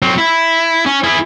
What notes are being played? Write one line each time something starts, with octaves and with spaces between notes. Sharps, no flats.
F#3 C4
E4
C#4
E4 G#4